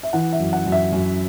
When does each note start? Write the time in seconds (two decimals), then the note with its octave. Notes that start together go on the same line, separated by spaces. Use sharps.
0.03 E5
0.13 E3 F#5
0.33 E5
0.40 F#2
0.53 F#5
0.66 F#2
0.72 E5
0.93 F#2